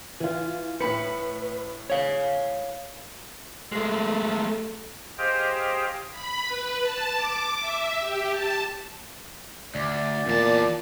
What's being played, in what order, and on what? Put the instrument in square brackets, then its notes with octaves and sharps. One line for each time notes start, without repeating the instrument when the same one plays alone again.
[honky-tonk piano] E3 F4
[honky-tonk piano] A2 B5 C#7 [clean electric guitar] B4
[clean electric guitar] C#5 F5
[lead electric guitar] G#3 A3
[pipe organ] G4 G#4 C5 D#5 F5 G5
[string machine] B5
B4
A5
D6
E5
G4
A5
[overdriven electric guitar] D2 [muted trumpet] D5
[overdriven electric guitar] E2 A5 [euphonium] A#2